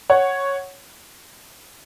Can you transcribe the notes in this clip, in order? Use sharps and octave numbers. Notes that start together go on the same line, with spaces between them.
C#5 F#5